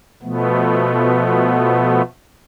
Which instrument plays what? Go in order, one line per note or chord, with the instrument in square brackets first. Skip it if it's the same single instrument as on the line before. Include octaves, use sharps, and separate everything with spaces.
[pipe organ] B2 F3 A3 B3